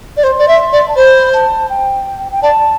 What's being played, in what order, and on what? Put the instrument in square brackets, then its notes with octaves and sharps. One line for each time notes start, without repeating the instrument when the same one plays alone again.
[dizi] D5
[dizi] C5 [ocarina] C6
[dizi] D5
E5
D5
[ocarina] A5
[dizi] C5 [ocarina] B5
[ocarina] A5
G5
G5
[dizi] D5 [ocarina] A5